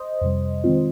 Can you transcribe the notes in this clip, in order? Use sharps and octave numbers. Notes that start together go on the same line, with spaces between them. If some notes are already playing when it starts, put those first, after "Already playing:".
Already playing: C5 D#5
F2 C3 G3
D#3 G#3 C4 F4